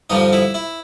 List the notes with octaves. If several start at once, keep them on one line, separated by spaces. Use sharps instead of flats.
G2 D3 F3 D#4
E4
E4